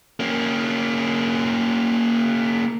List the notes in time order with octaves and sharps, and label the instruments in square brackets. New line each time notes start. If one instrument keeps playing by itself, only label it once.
[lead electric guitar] A#3 C#4